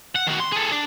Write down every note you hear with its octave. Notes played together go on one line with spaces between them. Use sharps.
F#5
D#3 F#4
C6
G#4 A4
D4